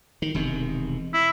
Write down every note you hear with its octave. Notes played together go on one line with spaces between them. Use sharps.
D#3
E1 C3 D#3
E4